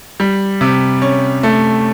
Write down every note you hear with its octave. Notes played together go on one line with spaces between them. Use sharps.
G3
C3
C#4
A3